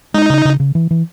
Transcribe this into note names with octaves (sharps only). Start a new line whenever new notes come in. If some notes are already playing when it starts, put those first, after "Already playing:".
G#3 D#4
C#3
C#3
C#3
E3
E3